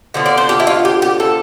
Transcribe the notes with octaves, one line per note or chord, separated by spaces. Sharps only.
D3 F3 B3
D5
C5
G4
E4
F4
G4
G4
A4